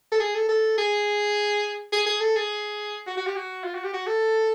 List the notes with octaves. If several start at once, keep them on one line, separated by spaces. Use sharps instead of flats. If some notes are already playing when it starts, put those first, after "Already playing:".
A4
G#4
A4
A4
G#4
G#4
G#4
A4
G#4
F#4
F#4
G4
F#4
F4
F#4
G4
F#4
A4